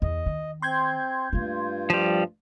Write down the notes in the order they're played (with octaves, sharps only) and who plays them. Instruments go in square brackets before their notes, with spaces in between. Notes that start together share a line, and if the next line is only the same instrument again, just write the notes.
[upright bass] E2 [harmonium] D#5
[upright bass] D#3
[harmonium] C4 [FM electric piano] C6 G6 G#6
[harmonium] G2 F4 [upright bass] A3 A#3
[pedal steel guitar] F3 G3